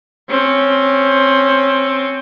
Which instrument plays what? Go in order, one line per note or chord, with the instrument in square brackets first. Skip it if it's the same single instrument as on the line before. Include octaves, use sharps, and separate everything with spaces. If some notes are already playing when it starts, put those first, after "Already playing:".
[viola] C4 C#4